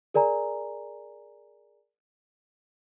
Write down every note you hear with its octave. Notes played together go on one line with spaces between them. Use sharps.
G#4 A#4 D5 G#5 A#5